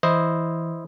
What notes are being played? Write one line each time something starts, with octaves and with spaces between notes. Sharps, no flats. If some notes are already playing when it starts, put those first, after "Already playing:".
E3 E4 C5 D#5